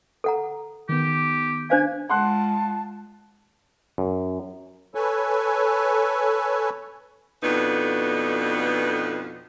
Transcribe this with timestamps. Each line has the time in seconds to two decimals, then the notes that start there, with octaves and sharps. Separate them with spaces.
0.24 A4 F#5 A#5
0.89 D#3 B3 G4
1.70 D4 C5 F5 G#5
2.10 G#3 F4 F#5 A5 C6 F#6
3.98 F#2
4.95 A4 B4 C#5 G#5
7.42 F2 B2 D3 B3 D#4